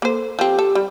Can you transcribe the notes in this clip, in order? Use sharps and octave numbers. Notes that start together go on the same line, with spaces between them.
A#3 A4 C5
F3 C4 G4
A4
G3